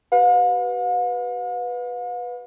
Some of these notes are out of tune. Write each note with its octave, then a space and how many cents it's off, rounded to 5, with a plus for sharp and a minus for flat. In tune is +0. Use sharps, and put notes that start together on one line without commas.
G4 -45 B4 +0 F5 +45